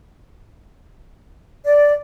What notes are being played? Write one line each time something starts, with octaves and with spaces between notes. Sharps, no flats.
D5